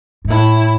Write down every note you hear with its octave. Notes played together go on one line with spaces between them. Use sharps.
G#2
A2 E4